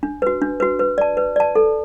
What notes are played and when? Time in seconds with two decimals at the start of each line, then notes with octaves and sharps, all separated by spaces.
0.03 D4
0.22 F#4 B4
0.42 D4
0.60 F#4 B4
0.79 B4
0.98 D5 A5
1.17 B4
1.36 D5 A5
1.55 A4